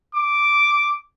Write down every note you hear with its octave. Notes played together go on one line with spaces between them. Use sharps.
D6